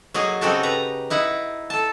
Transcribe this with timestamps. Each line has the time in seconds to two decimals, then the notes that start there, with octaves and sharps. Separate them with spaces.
0.14 F#3 A#3 D#4 G#4
0.41 C#3 C4 D#4 F#4 G4 A4
0.63 B4 A#5
1.10 D#4 E4 F#5
1.70 A4 A5